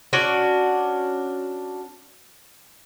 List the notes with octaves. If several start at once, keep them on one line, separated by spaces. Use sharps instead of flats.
C#4 D4 F#4 D5